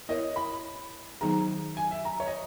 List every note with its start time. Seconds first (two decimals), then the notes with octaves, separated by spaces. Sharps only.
0.09 B3 E4 A#4 C#5 D#5
0.36 B5
1.21 D#3 F#3 B3 D#4 G#4 A#5
1.77 G#5
1.91 E5
2.05 A#5
2.20 C#5
2.27 D#5